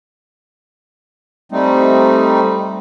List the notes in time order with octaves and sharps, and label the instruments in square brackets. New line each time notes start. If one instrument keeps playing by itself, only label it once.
[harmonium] G3 A3 C4 D#4